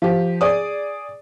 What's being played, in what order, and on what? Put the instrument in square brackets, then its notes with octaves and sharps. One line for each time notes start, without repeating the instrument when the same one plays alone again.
[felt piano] F3 G4
G#4 D5 D#6